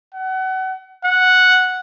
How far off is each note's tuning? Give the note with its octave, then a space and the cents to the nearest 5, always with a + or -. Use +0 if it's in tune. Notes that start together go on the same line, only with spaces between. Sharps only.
F#5 +30
F#5 -5